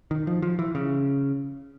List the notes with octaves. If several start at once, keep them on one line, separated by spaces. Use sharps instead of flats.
D#3
F3
F3
E3
C#3